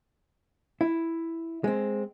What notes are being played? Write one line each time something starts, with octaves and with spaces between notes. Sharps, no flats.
E4
G#3 C4